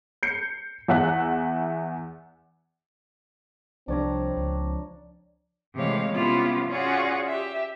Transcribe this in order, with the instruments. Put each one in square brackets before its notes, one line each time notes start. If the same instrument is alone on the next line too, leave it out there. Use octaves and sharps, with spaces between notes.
[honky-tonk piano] G6 C7 C#7
E2 E5 F#5 F#6
[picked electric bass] C2 G3 [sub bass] F3 [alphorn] C4 [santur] D4 C#5 A#5
[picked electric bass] C#2
[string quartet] C3 E3 G#3 A3 C#5 F5
C3 G3 B3 C#4 E4 F4
C#4 F4 F#4 G#4 C#5 D5
G4 E5